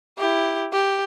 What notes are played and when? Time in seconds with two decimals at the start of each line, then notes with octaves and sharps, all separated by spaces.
0.18 E4 G4
0.73 G4